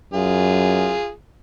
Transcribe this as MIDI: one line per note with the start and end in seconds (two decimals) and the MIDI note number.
0.14 0.97 42
0.14 1.11 65
0.14 1.11 68